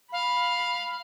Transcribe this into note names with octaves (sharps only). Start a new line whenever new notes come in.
F5 B5